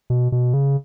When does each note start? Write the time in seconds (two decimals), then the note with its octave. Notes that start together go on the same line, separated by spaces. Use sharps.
0.10 B2
0.32 B2
0.54 C#3